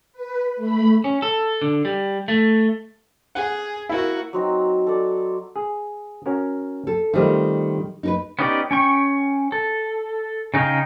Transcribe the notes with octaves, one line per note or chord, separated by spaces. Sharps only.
B4
A3 B5
C#4
A4
D3
G3
A3
G#4 F#5
A#3 E4 F#4
F#3 C4 D#4
A4 D5
G#4
C#4 F#4 A#4
A4
D#3 G3 A3 C4 F4 D#5
D#4 A#4 B4
B3 C#4 D#4 G4 D5
C#4 G5 C#6
A4
C#3 D#4 G#4 F5 G5